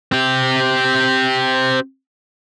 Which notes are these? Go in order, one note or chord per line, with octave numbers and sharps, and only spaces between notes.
C4 G4